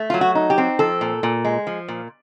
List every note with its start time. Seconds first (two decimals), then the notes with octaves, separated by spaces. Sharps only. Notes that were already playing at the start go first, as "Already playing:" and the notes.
Already playing: A3
0.10 F#3 F4
0.21 F#4
0.35 D#4
0.50 G4
0.58 C4
0.79 F3 A4
1.01 A#2
1.23 A#2
1.45 G#3
1.67 F3
1.88 A#2